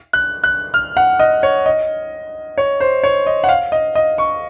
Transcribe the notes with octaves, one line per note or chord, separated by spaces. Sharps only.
F#6
F#6
F6
F#5
D#5
C#5
D#5
C#5
C5
C#5
D#5
F#5
F5
D#5
D#5
C#6